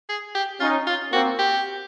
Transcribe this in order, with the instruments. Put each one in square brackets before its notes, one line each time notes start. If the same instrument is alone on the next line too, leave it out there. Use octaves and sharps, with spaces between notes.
[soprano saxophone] G#4
G4
[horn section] C#4 D#4 [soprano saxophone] F4
[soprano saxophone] F4
[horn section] A#3 C4 [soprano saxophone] F#4
[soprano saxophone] G4